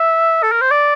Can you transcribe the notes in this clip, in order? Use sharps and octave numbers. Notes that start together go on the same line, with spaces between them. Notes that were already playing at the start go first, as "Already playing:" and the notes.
Already playing: E5
A4
A#4
C5
D5